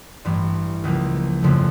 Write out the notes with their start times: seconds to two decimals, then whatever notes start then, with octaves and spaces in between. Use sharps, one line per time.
0.25 A1 G2 E3
0.84 C#2 C#3 F3 A#3
1.42 G1 F2 C#3 F3 A3